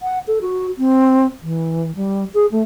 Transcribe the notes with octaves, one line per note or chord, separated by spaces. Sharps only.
F#5
A4
F#4
C4
E3
G3
G#4
A3